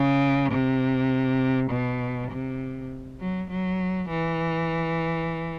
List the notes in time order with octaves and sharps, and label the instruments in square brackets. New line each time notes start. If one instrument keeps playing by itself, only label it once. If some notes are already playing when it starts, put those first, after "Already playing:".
Already playing: [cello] C#3
C3
B2
C3
F#3
F#3
E3